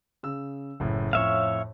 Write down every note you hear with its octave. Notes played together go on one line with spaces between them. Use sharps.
C#3 E6
F#1 A2
F2 A2 C#5 E5 F5